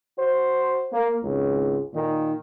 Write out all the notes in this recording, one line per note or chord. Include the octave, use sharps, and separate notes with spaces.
F#4 C5
A#3
G#1 C#2
A#2 D#3